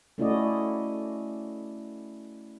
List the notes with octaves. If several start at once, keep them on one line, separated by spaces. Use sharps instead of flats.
A3 C#4 E4 F#4 D5 D#5